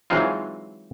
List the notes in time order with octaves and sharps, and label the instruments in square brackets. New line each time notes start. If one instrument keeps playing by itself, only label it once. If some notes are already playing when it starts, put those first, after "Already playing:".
[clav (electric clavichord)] E3 F#3 G#3 C4 D#4 F4